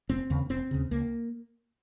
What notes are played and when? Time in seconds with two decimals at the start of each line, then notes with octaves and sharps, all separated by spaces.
0.09 F1 C4
0.30 D#2 C#3
0.50 F1 C4
0.71 D#2 C#3
0.91 C#2 A#3